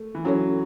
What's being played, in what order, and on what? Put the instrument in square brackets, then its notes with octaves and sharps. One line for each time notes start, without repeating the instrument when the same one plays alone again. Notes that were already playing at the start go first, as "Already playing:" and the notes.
Already playing: [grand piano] A3
E3
[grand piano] F#3 [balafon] C#4 A4 C#5